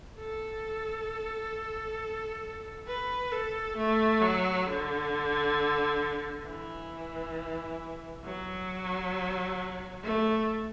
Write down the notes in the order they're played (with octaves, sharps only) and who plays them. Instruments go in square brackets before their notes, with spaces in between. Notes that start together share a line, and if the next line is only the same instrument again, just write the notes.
[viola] A4
B4
A4
A3
F#3
D3
E3
F#3
A3